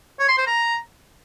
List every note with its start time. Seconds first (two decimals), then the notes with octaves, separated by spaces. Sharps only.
0.19 C#5
0.28 C6
0.38 C5
0.47 A#5